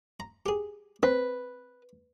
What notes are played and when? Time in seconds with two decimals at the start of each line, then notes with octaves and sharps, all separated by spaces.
0.20 A#5
0.46 G4 G#4
1.03 C4 B4